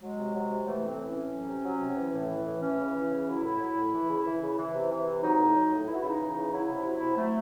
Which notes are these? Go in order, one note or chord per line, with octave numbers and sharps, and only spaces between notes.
F#3 G#3
C3
F#3
C3
E3 A3
A2 C4
E3
C#4
A2
F#3
C3
F#3
C3
E3
A2
E3
A2
E3 C#4
C#3
E3
C#3
F#3 E4
A2
F#3
A2
E3
C#3
E3
C#3
E3
C3
E3
C3
F#3 D#4
A2
F#3
A2
E3 E4
F#4
C#3 E4
D#4
E3
D#4
C#3
F#3 E4
C3 E4
F#3
E4
C3
F#3 A3